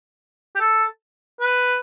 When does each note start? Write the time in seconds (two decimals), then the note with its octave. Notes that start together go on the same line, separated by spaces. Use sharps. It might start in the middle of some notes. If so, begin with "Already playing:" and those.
0.55 G4
0.60 A4
1.40 B4